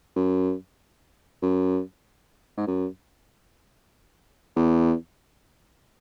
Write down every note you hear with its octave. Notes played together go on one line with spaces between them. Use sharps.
F#2
F#2
G#2
F#2
E2